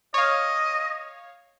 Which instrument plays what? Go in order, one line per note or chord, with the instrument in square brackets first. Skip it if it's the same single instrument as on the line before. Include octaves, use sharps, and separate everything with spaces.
[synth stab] C#5 F5 [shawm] D#5